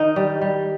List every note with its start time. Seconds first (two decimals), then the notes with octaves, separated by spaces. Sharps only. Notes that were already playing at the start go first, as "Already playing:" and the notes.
Already playing: D#3 D#4
0.16 G3
0.41 G3